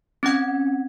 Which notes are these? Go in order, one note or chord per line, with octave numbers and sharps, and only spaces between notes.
C4 C#4 F#5 G#6